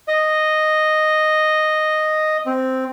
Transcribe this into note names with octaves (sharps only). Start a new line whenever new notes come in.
D#5
C4